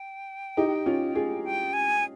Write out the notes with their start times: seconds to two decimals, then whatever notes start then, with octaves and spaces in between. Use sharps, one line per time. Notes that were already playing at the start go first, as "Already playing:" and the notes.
Already playing: G5
0.57 D#4 G4
0.86 C#4 F4
1.15 F4 G#4
1.44 G5
1.73 G#5